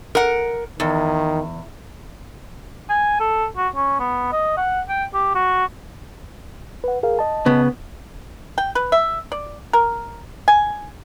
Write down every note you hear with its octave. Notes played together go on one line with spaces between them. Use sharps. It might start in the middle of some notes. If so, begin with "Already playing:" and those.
A#4 F#5
E2 D#3
G#5
A4
F#4
C#4
B3
D#5
F#5
G5
G4
F#4
B4 F#5
G#4 A#4 F5
D#5 A5
C#3 B3
G5
B4
E5
D5
A#4
G#5